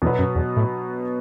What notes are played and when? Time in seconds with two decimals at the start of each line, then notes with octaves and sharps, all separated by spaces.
0.02 E2 B2 F#3 B3
0.19 F#2
0.35 E2
0.57 A2